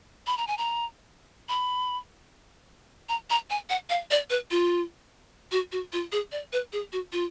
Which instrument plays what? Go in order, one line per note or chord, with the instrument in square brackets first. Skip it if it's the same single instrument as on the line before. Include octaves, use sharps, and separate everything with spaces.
[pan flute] B5
A#5
G#5
A#5
B5
A#5
A#5
G#5
F#5
F5
D5
B4
F4
F#4
F#4
F4
G#4
D5
B4
G#4
F#4
F4